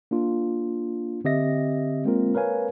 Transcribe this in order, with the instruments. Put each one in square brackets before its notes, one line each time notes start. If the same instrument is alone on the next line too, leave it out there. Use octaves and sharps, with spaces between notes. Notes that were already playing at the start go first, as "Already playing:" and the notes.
[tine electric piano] A#3 D4 F4
D3 C4 G4 D#5 E5 A#6
G#3 A#3 C4 F4 A#4
A#4 B4 C#5 F5 G#5